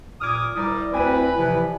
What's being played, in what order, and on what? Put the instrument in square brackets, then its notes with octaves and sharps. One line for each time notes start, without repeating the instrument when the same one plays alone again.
[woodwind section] A#2 D6 D#6 [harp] F6 G#6
[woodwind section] G3 [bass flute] E4 [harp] D5 A#5 D#6
[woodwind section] D2 C4 [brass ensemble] B4 [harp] G#5 D#7
[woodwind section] C3 E3 F3